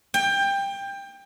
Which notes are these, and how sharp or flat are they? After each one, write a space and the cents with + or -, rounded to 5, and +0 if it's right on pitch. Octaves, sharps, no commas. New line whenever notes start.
G5 +20